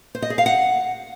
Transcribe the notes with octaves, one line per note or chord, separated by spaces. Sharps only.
C5
D#5
G#4
F5
F#5